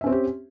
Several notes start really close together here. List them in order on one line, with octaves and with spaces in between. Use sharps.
E5 C#4 C4 C5 G4